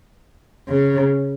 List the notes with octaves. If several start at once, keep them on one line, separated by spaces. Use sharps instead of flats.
C#3